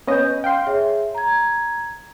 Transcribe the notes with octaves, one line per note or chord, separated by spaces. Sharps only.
B3 C#4 B4 D#5 G6
F5 G5 C6 F6
G#4 C#5 E5
A#5 G#6